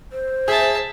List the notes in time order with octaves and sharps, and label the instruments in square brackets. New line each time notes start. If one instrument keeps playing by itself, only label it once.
[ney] C5
[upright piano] G#4 [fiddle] E5 A5